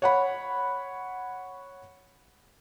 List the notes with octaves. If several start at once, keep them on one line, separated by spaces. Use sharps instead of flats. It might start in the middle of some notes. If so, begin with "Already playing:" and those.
C#5 F#5 B5